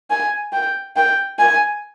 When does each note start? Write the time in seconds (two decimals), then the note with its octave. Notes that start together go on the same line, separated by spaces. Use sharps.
0.10 G#5
0.53 G5
0.96 G5
1.39 G#5